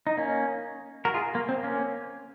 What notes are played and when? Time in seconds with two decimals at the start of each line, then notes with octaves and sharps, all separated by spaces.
0.07 D#4
0.17 A#3 C#4
1.05 F#4 A#4
1.14 F4 G#4
1.35 A#3
1.49 C4
1.63 A#3 C#4